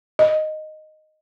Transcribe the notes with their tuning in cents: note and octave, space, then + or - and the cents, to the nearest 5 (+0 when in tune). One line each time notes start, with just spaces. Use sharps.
D#5 -5